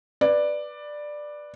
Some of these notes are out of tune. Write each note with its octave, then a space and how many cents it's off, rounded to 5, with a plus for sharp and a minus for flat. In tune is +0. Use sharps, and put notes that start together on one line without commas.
B4 -5 D5 +10